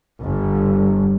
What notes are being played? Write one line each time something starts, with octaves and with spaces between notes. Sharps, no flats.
G1